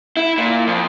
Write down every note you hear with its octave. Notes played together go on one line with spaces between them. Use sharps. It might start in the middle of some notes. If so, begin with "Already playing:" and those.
E4
A#2
F2